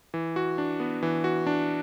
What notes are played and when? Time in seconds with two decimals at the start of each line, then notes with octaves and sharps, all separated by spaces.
0.14 E3
0.36 F#4
0.58 D4
0.80 B3
1.03 E3
1.24 F#4
1.47 D4